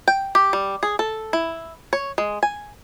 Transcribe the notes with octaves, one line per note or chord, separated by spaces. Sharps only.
G5
G4
G3
G#4
A4
E4
C#5
G#3
G#5